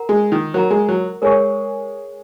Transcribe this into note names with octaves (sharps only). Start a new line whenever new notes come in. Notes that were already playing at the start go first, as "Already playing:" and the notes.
Already playing: A#4 F#5 A#5
G#3
D#3
F#3 A#4 F#5 A#5
G#3
F#3
G#3 A#4 C#5 G#5 C#6